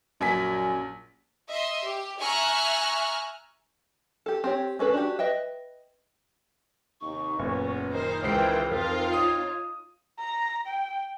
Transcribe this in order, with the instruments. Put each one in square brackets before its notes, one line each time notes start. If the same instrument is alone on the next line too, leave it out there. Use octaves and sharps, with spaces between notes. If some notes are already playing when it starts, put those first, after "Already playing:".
[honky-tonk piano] A#1 G#5 B6 [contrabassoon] F#2
[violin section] D#5 E5 C6
G4
E5 G#5 A#5 C#6 F6 F#6
[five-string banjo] G4 A4
C4 G4 C#5
G#3 C#4 A4 B4
D4 F#4 G4
B4 D#5 E5 G5
[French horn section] D#2 C3 D#4 [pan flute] C#6
[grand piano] F#1 A#2 [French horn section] E2 B3 C#4
[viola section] D#3 D#4 C5 [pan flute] A#4
[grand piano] C#2 C7 [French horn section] D#3 F4 C5 [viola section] E3 G5
[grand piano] F2 [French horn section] F3 C4 [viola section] D#4 F4
[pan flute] C#5 [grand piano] D#6
[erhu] A#5
G5